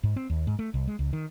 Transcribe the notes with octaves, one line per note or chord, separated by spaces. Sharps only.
G#2
C4
D#2
G#2
A3
C2
G#3
C#2
D#3